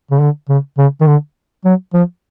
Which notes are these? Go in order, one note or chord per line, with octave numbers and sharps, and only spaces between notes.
C#3
D3
C#3
C#3
D#3
D3
F#3
F3